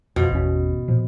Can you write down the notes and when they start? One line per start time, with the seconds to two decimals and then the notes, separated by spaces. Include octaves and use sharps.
0.16 F2 B2 F3
0.30 G#1 E2 C#4
0.88 A#2 F3